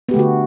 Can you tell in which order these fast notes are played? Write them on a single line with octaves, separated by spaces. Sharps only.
B3 G4 A3 D3 F#4